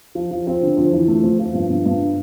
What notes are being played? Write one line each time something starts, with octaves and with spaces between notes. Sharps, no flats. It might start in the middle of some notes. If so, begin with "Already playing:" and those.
F3
F3
C4
D3
F2
E3
A3
F2
F3
G2
G2
G2